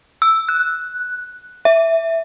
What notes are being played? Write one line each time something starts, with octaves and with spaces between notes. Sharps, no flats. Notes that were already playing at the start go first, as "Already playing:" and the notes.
E6
F#6
E5